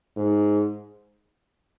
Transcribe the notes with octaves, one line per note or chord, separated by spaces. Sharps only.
G#2